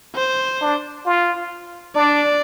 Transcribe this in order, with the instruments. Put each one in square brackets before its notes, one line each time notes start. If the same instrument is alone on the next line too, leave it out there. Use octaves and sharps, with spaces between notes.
[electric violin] C5
[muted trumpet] D4
F4
[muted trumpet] D4 [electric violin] D5